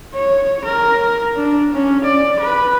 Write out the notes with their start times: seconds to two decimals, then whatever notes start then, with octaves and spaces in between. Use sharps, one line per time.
0.14 C#5
0.65 A#4
1.36 D4
1.73 C#4
2.05 D5
2.40 B4